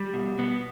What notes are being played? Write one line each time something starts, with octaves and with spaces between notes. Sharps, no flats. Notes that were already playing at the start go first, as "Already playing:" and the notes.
Already playing: G3
B2
B2 B3